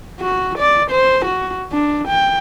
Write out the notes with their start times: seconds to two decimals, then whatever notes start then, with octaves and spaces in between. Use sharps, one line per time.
0.20 F#4
0.58 D5
0.91 C5
1.25 F#4
1.72 D4
2.08 G5